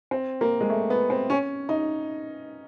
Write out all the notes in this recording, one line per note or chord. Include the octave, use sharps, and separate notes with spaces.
C4
A#3
G#3
A3
B3
C4
C#4
D#4